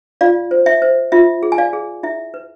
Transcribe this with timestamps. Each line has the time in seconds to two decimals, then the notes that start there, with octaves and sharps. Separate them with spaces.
0.21 F4 D5 F5
0.51 C5
0.66 E5
0.82 C5
1.12 F4 E5
1.43 G#4
1.52 G#5
1.58 D5 F5
1.73 G#4
2.03 E4 E5
2.34 B4